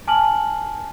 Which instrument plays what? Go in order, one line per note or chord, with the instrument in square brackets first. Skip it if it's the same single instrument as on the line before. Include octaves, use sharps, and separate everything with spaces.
[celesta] G#5 A5 F6 F#7